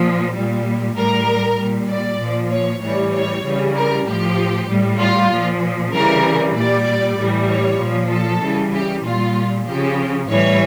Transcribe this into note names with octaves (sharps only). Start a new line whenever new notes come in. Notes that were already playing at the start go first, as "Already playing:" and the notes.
Already playing: A#2 F3
A#2 G3
A2 G3 A#4
A#2 G3
D5
A#2 F3
C#5
A2 E3 G3 C#5
C#5
C#3 E3 G3
A#4
A2 F3 G4
A2 G3
F4
A#2 F3
C#3 E3 G3 A#4
A#2 G3 D5
A2 E3 G3
C#5
A#2 F3
A4
C#3 E3 G3
G4
A#2 G3 F4
C#3 F3 G4
A2 E3 G3 C#5